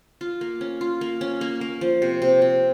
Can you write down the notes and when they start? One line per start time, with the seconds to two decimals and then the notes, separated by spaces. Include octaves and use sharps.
0.21 F4
0.41 A#3
0.61 C#4
0.81 F4
1.01 A#3
1.21 C#4
1.41 A#3
1.61 A#3
1.81 F3
2.02 C3
2.22 C3
2.42 C3